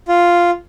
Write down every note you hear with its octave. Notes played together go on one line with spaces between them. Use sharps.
F4